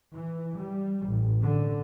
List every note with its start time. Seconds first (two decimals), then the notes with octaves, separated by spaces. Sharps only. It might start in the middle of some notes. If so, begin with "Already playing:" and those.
0.14 E3
0.58 G3
1.07 A1
1.41 D3